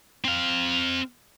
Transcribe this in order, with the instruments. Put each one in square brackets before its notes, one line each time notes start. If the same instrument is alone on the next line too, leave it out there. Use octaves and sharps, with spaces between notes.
[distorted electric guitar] C4 F5